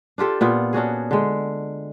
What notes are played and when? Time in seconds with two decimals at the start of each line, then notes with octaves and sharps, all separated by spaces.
0.18 D4 F4 G4 A4
0.41 A#2 B3 F4
0.73 C#4 D4 F#4 G#4
1.11 D3 G#3